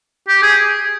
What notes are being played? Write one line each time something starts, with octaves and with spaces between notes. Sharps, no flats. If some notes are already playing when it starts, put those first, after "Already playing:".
G4
G#4